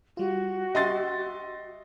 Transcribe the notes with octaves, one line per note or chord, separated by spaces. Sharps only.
G3 F4 F#4
G4 D#5 E5 C6 A6